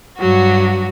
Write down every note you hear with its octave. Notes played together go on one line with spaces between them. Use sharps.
G2 F#3 F#4